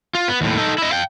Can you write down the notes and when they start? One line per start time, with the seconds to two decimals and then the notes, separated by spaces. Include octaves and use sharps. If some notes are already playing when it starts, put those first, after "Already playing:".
0.15 F4
0.28 B3
0.41 D#2 A2
0.57 D#4 A4
0.78 E4 D#5
0.91 F5 G5